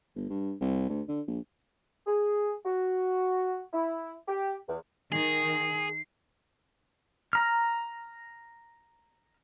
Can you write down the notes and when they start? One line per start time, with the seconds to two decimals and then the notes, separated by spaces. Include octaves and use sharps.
0.16 G1
0.30 G2
0.61 C2
0.90 D2
1.08 D3
1.27 A#1
2.06 G#4
2.65 F#4
3.73 E4
4.28 G4
4.67 E2
5.12 D#3 G#4 C7
7.33 A#5 F6